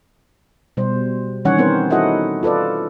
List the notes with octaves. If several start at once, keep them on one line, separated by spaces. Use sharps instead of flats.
B2 G3 C5
D#3 E3 G3 C#4 C#5 F#5
B3 C4 A#4 C5
D#4 E4 F#4 A4 D#5 F#5
F4 A4 B4 D5